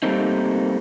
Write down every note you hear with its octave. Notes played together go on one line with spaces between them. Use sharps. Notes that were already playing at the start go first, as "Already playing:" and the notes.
G3 A3 A#3 C4 D#4